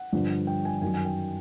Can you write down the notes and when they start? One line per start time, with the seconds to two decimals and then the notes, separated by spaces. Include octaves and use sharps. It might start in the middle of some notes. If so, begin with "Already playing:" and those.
Already playing: F#5
0.13 G2 D3 F3
0.47 G5
0.65 G#5
0.82 F#2 D#3 F#3 G#5
0.94 G#5
1.05 G5